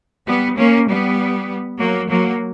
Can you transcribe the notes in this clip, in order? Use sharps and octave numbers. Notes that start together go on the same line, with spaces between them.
G3 B3
A#3 C#4
G3 B3
F#3 A#3
F#3 A#3